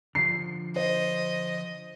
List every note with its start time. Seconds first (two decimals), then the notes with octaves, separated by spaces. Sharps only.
0.15 D3 F3 C7
0.76 C5 D#5